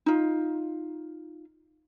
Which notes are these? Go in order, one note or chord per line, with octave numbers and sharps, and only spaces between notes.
D#4 F4